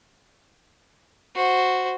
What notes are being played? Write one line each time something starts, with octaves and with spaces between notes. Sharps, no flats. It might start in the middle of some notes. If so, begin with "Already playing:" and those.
F#4 C5